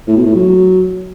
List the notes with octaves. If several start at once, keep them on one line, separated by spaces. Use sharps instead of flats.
A2
B2
A2
F#3